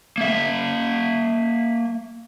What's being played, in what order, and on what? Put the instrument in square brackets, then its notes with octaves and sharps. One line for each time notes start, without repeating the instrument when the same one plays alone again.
[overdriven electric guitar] A#3 E5